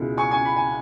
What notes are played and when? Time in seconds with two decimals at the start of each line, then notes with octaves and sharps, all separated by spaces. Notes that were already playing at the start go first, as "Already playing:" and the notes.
Already playing: C#2 B2 G#3 E4
0.17 G#5 C#6
0.31 G#5 C#6
0.45 B5
0.56 G#5